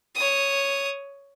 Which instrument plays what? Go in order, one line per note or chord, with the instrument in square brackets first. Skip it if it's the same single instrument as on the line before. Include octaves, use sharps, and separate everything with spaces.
[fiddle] C#5 D#6